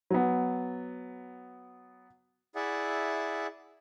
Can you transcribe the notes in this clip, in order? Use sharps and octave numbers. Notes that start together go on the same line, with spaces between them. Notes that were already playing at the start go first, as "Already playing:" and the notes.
F#3 B3
E4 G#4 D5 E5 F#5